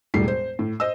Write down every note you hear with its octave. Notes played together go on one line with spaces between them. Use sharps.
E1 A2 G3 C7
C5
A2
C5 D#5 E6